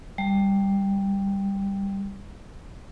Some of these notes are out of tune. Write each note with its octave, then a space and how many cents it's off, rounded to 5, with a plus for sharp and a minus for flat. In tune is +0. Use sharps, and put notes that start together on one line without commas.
G3 +5